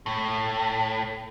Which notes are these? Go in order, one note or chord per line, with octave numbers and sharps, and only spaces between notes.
A2